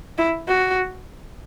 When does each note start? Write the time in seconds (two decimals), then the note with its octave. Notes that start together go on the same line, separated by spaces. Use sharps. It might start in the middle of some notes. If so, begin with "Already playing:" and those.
0.18 E4
0.48 F#4